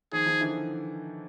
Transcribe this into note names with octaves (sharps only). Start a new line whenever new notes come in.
D#3 F3 G#4
D#3 F3
D3 E3